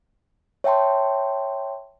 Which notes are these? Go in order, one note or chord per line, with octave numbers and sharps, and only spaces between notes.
C#5 E5 G5 A5 C6